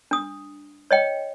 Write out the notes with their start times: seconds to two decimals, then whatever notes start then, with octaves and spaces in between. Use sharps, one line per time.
0.11 D4 D#6
0.91 C#5 D#5 G5